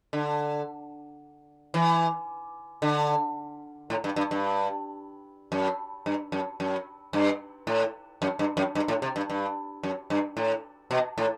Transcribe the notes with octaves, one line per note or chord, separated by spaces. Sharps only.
D3
E3
D3
A2
G2
G2
G2
F#2
G2
F#2
F#2
G2
A2
F#2
G2
F#2
G2
A2
C3
G2
G2
F#2
G2
A2
B2
A2